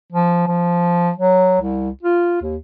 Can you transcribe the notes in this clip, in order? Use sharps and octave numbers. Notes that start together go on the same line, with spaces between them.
F3
F3
F#3
C2
F4
D#2